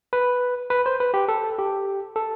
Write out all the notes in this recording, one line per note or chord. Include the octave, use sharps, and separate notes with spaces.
B4
B4
C5
B4
G4
A4
G4
A4